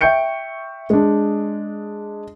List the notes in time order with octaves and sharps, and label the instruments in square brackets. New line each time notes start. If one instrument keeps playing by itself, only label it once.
[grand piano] E5 G5 C#6 G6 C#7 D7
G#3 D4